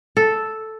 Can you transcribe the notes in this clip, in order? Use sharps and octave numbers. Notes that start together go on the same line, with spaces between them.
A4